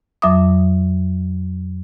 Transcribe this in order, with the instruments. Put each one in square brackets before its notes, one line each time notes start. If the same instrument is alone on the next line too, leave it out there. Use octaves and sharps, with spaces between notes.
[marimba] F2 F#3 E5 D6 D#6